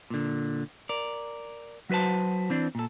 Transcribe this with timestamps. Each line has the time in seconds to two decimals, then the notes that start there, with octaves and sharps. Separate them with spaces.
0.10 A#2 D3
0.89 A#4 D5
1.90 F#3 F#4 B4 C5 A5
2.50 E3 C4 D4
2.75 A#2 A4